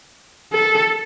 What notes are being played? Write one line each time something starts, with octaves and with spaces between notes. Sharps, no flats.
A4